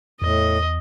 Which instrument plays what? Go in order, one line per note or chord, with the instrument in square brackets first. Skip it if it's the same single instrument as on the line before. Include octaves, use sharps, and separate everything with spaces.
[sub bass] E2 [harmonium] A2 [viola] D#5